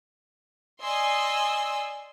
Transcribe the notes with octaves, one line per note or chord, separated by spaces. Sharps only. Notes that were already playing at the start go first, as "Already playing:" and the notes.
D5 D#5 G#5 C6 E6